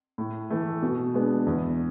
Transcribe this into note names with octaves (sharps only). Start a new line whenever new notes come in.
A2
E3 A3
B2
G#3 B3 D4
E2